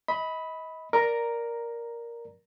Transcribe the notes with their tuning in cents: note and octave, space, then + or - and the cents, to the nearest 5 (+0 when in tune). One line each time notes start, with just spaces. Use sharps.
D#5 +35 B5 +0
A#4 +5 D5 +0 A#5 +0